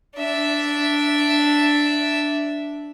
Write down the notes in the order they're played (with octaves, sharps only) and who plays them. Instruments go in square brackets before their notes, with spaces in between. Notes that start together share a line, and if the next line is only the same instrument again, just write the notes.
[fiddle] D4 E5